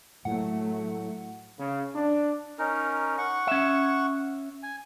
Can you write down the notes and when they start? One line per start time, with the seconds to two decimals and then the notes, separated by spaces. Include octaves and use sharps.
0.25 A2 F#3 A3 F#5
1.58 C#3
1.94 D4
2.58 C#4 D#4 A#4
3.18 F#5 C#6
3.47 C#4 E5
4.63 G#5